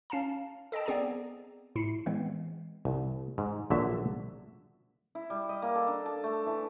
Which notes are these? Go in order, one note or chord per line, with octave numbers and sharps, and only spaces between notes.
C#4 F5 A5 A#5
A4 D#5 G5 A5
B3 C4 G#4 D5 G#5 A#5
A2 E4 C7 C#7
E3 G#3 B3 C4
C2
G#2
A#1 D3 F#3 E5
E4
G3
D#5
A#3
A4
D4
A5
A3
E3